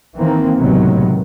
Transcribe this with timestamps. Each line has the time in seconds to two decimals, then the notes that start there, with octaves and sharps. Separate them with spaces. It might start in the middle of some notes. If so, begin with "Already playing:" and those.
0.17 D#3 E3 A#3 C4
0.58 C#2 A2 C3 D#3 F#3 B3